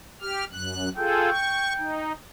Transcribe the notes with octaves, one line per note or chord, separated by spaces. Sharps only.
G4 F6
F#2 F#6
F4 G#4 A4 G5
C#6
D#4